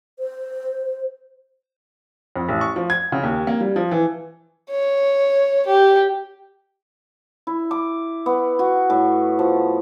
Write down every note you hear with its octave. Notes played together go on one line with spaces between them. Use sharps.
C5
F2
A1
C#6
F3
G#6
C#3
D#2
A#3
G3
F3
E3
C#5
G4
E4
D6
B3
F#4
A2
F3